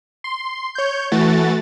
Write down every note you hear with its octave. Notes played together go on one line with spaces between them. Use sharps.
C6
C#5 G6
E3 A3 F#4 A6